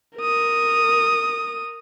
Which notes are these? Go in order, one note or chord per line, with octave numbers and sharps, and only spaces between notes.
A#4 D#6